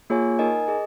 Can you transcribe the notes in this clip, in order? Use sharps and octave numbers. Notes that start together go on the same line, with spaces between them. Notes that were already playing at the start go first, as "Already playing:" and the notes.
A#3 F4 G#4 C#5 G#5
D#4 A#4 D#5 G#5
G#4 D#5